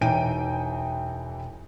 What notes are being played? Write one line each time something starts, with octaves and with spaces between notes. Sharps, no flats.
E1 E3 D#4 G5 D7 D#7